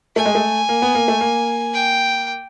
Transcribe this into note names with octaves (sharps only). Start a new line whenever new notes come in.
A3 G#5
G#3
A3
A#3
B3
A#3
A3
A#3
G5